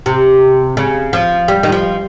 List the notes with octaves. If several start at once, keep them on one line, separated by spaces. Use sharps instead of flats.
C3
C#3
F3
G3
D#3
F3